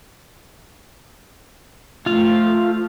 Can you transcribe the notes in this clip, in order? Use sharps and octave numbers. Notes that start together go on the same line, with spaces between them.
F3 A3 F4 F5